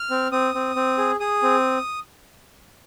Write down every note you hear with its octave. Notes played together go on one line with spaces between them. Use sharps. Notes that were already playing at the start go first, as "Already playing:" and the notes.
Already playing: F6
C4
C4 D#6
C4
C4
G#4
G#4 D#6
C4